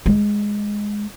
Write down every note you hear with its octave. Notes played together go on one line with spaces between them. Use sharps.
G#3